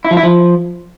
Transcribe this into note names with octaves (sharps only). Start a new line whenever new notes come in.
E4
F3
E4
F3